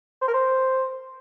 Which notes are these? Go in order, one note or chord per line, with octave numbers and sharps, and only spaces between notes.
C5
A#4
C5